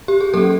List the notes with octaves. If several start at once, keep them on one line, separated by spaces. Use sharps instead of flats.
G4
G#4
F#3 A#3 C#4 G4 A4